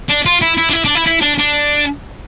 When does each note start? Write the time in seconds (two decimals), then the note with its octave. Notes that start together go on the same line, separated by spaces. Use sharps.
0.09 D4
0.26 F4
0.41 E4
0.57 E4
0.69 D4
0.73 E4
0.85 D4
0.95 E4
1.07 E4
1.22 D4
1.39 D4